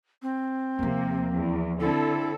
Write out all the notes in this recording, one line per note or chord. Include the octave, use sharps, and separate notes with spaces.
C4
D#2 C3 F3 A#3
E2
D3 C4 E4 A4